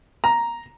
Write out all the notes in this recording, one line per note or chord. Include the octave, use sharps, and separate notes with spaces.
A#5